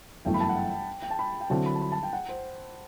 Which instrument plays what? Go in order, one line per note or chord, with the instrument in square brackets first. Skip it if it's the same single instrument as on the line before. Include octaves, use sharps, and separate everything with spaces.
[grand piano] G1 F#2 E3 A3 [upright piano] G5
[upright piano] B5
A5
F#5
G5
G5
A5
B5
G5
[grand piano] D3 F#3 C4 E4 [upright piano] A5
[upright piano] B5
A5
B5
A5
G5
F#5
C5